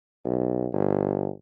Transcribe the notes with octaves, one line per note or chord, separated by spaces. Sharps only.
B1
G1